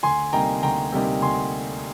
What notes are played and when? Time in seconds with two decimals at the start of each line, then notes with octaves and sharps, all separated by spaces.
0.03 D2 G#5 C6
0.33 C3 G3 A#3 D#4 G5 A#5
0.63 D2 G5 A#5
0.92 C3 G3 A#3 D#4
1.22 D2 G#5 C6